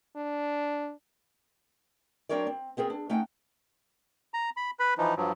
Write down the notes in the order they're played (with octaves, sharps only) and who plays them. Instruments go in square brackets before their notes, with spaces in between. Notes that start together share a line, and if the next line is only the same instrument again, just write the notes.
[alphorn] D4
[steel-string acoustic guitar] F#3 C4 D4 A#4 C#5 D5
C4
B3 C4 G#4 A#4
D4
A3 C#4 D#4 F#5 G5
[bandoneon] A#5
B5
B4 B5
E3 F3 D#4
G2 F3 F#3